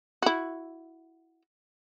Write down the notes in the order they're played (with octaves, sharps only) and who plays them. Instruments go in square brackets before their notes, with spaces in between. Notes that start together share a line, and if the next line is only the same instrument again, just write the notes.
[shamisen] E4 F#4